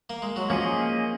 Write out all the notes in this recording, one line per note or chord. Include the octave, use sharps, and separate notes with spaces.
A#3
G#3
F#3
F3 A#3 C#4 G#4 D#5